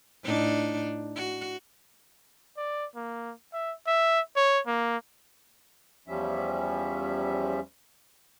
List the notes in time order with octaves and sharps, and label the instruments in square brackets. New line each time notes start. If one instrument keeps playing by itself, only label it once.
[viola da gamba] A2 D4 D#4
F#4
[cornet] D5
A#3
E5
E5
C#5
A#3
[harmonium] E2 F3 G3 C#4 E5